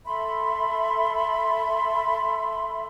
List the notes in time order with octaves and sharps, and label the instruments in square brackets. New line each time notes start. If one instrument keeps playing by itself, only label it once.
[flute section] A4 E5 B5 C6